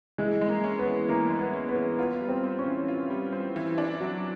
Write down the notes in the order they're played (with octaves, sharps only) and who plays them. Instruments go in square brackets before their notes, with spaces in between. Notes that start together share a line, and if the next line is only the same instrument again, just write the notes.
[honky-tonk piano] E3 [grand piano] G#3
[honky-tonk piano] G#3
[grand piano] A#3
[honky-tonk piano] C#4
[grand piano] B3
[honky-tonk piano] E3
[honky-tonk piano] E3 [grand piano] A#3
[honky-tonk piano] G#3
[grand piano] B3
[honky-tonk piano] C#4
[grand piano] B3
[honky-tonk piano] E3
[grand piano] B3 [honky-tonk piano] F4
[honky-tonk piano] G3
[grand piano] C4
[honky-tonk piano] C4
[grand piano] C#4
[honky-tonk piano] E3
F4
G3
C4
E3
D4
F#3